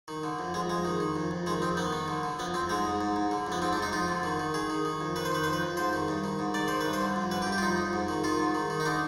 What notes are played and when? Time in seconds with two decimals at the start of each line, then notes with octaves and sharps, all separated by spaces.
0.08 D#3
0.24 D3
0.39 F2
0.54 F2 G#3
0.70 F2 G#3
0.85 D#3
1.00 D#3
1.16 F2
1.31 F2
1.46 D#3 G#3
1.62 F2 C4
1.77 D#3 B3
1.93 D#3
2.08 D3
2.23 D3
2.39 F2 B3
2.54 F2 C4
2.69 G#2 G#3
2.85 G#2
3.01 G#2
3.16 G#2
3.31 D3
3.47 F2
3.52 B3
3.62 G#2 C4
3.73 D4
3.77 G#2
3.82 D#4
3.92 F2 F4
4.08 D3
4.23 D#3
4.40 D#3
4.54 D#3 G#4
4.70 D#3
4.85 D#3
5.01 F2
5.16 D#3 B4
5.25 C5
5.32 D#3 B4
5.44 F2 C5
5.53 B4
5.62 F2
5.77 G#2 C5
5.93 D#3
6.08 G2
6.24 D#3
6.39 G#2
6.54 D#3 D5
6.68 D#3 C5
6.81 G2 B4
6.93 C5
7.01 D3
7.16 F2
7.31 D3 B4
7.42 G4
7.47 G2
7.52 G4
7.58 F4
7.62 F2 D#4
7.78 F2
7.93 G#2
8.09 D#3
8.24 D#3 F4
8.39 G#2
8.55 D#3
8.70 D#3
8.80 D#4
8.85 D3 D4